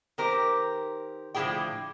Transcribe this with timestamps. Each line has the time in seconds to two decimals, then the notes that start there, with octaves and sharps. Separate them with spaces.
0.18 D#3 G4 A#4 C5
1.34 A2 D3 F3 E4 G#4 G5